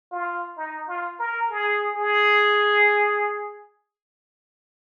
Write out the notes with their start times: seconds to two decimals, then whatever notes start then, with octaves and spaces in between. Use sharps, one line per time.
0.12 F4
0.57 D#4
0.88 F4
1.19 A#4
1.50 G#4
1.96 G#4